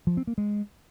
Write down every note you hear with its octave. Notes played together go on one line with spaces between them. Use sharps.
F3
C4
A#3
G#3